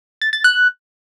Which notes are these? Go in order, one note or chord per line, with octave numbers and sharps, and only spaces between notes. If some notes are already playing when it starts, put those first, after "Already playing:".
A6
A6
F#6